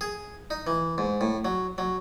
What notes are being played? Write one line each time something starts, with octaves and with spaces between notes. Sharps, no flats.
G#4
D#4
E3
G#2
A2
F#3
F#3